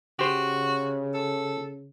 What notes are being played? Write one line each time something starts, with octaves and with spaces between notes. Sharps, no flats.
C#3 F#4 G4 C5
A4